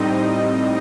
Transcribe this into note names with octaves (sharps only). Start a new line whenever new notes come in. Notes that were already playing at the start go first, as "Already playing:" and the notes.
Already playing: A2 G3 C4 D#4 D#5